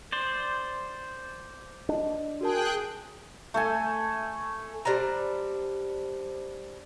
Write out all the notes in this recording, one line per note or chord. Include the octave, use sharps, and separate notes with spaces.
C5 D5
D4 D#5
F#4 G#4 A#4 G5 A5 F#6
A3 A4 G#5
G3 D4 C5 A#5